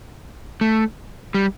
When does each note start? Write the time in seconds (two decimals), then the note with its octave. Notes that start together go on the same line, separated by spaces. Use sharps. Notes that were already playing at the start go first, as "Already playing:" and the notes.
0.61 A3
1.34 G3